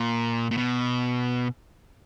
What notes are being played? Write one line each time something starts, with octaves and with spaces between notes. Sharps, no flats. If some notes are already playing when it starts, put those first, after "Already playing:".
Already playing: A#2
A#2
B2